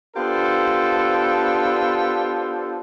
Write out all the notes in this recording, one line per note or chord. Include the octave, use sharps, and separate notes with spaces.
B3 D4 F4 G4 A4 C5